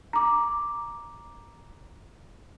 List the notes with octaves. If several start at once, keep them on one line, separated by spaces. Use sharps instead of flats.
A#5 D6